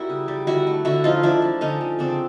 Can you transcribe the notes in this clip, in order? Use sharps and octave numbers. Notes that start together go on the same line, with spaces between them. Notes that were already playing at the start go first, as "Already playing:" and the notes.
Already playing: G3 E4 F#4 A#4
C#3
G3
D3 E4 F#4
A3
D3 E4 F#4
F3 D#4 F4
F3 D4 E4
F3
D3 C#4 D#4
D3
C#3 C4 D4